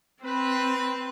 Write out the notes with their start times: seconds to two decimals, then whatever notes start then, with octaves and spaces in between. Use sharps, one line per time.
0.23 C4 B4